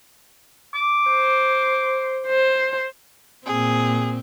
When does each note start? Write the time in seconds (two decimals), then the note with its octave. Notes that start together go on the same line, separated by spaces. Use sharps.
0.75 D6
1.09 C5
2.27 C5
3.46 A#2 C4 G#4